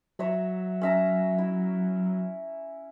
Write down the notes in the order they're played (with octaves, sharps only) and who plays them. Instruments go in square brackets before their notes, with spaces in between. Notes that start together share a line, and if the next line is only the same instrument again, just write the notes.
[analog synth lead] F#3 [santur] C#5 E5 A#5
[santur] C#4 E5 A#5
E4